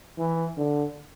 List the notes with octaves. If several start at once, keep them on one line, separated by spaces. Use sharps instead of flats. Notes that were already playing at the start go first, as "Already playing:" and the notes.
E3
D3